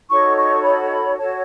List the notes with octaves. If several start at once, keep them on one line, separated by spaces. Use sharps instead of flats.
D#4 F#4 A4 C#5 C#6
C#6
B5
F#4 A4 C#5 A5